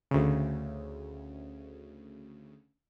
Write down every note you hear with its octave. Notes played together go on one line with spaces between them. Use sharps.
D2 C#3